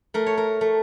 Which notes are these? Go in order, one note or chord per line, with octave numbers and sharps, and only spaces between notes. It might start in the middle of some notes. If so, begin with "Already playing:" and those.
A3 A#4
C#5
A#4
A3